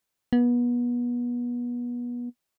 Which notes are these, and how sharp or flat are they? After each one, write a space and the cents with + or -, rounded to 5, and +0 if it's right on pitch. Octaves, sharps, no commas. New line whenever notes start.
B3 -30